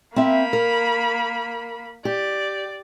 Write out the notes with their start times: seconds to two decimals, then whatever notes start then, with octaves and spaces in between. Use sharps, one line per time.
0.16 A#3 C4 E5 B5
0.53 A#4
2.05 G4 D5